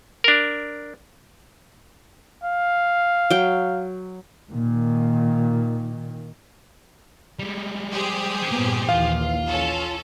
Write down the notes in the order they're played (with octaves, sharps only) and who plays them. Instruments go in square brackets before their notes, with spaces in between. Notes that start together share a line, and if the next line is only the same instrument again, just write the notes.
[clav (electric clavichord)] D4 A#4
[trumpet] F5
[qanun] F#3 G5
[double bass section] A#2 D#3
[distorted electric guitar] G3 G#3
[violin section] G4 G#4 C5
[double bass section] G2 A#2 B3 [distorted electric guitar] G3 A#3
[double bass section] A#1 D#2 E3 [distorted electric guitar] F4 [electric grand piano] F5
[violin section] C#4 A4